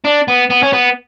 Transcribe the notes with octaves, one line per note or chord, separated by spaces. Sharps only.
D4
B3
B3
C#4
B3